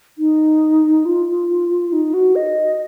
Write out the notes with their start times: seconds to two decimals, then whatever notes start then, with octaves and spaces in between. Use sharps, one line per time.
0.18 D#4
1.05 F4
1.92 D#4
2.14 F#4
2.35 D#5